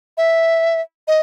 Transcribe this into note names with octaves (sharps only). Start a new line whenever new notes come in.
E5
D#5